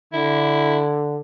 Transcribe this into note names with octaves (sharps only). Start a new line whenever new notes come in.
D3 E4